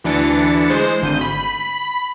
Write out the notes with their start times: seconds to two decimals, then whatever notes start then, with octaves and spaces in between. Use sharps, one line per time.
0.04 D2 E3 D4 A6 C#7
0.70 G#3 C5
1.02 G#1 D2 G6 D#7
1.21 B5